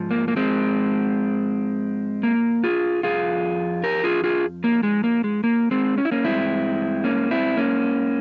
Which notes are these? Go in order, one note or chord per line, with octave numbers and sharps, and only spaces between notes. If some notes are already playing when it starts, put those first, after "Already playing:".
Already playing: G#2 F3
A#3
A#3
G#3 C4
A#3
F4 G#4
F2 C#3 F3 F4 G#4
G4 A#4
F4 G#4
F4 G#4
A#3
G#3
A#3
G#3
A#3
G#3 C4
C#4
E4
A#3 C#4
G2 E3 G#3 C4 E4
A#3 C#4
C4 E4
A#3 C#4